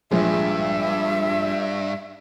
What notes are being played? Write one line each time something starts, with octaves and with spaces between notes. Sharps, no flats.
A#1 E2 G2 G#3 E5